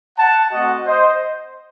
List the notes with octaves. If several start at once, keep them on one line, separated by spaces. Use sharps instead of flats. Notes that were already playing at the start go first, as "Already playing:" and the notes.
F#5 A5
A3 C4 F#4 D#5 F#5
C5 D#5